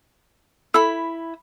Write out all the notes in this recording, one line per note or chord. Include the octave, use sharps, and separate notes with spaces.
E4 A4 B5